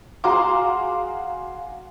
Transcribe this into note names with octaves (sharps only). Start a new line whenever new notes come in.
F#4 G#4 F5 A#5 C6 D6